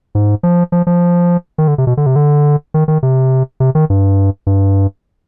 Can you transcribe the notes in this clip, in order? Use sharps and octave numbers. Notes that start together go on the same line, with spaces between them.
G#2
F3
F3
F3
D#3
D3
C3
B2
D3
C3
D3
D#3
D#3
C3
C3
D#3
G2
G2